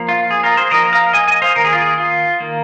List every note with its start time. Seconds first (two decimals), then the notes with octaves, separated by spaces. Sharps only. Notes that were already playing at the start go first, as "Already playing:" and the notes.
Already playing: F3 A#3
0.08 F4
0.31 G#4
0.43 F4 A#4
0.57 G#4 C5
0.71 F3 A#3 A#4 D#5
0.93 F5 A#5
1.13 D#5 G#5
1.28 D#5 G#5
1.42 C5 F5
1.56 D#3 A#3 A#4
1.65 G#4
1.73 F4
1.81 G#4
1.98 F4
2.40 D#3 A#3